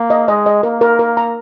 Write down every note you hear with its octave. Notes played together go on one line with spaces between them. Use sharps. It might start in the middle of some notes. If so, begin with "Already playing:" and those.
Already playing: A#3
D#5
G#3 D#5
D#5
A#3 A#4
A#4
A#4
A#5